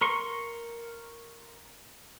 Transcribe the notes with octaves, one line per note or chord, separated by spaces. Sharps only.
A#4 C6 C#6